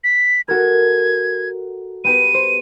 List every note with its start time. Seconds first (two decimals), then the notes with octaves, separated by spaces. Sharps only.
0.04 B6
0.48 F#4 A4 A#4 G#6
2.04 B3 G4 B4 D#7
2.34 C5